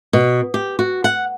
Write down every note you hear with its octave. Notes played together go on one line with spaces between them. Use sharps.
B2
G4
F#4
F#5